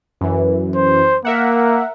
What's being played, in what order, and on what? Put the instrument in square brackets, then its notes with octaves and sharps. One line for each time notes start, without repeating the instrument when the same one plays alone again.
[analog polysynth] F#2 E3
[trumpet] C5
[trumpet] A#3 [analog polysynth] A#4 E5 F#5